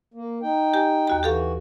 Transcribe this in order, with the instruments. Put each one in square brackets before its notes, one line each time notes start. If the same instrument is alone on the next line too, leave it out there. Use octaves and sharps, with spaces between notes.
[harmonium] A#3
D#4 G5
[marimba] G4 G#5
D#2 F#4 A#5
[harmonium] E3 F#4 [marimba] G4 A4 F5